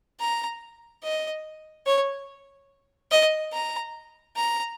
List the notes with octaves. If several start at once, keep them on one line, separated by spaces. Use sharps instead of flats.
A#5
D#5
C#5
D#5
A#5
A#5